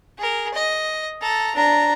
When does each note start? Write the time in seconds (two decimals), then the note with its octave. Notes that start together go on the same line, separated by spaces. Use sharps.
0.18 G#4 A#4
0.54 D#5
1.21 A4 A#5
1.56 D4 A#5